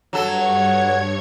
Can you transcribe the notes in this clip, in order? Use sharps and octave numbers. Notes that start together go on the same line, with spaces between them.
G2 F#3 A4 C#5 G#6